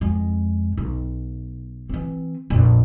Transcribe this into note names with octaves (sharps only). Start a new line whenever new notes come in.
F2 G#3
B1
E3 C4
A#1 F2